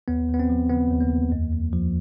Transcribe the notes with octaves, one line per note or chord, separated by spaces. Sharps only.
D#2 B3
D#2
B3
C4
F3
C#3 B3
D#2
A#3
D#2
F2
F2
F3